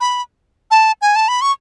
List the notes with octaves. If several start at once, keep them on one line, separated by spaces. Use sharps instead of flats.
B5
A5
G#5
A5
B5
C#6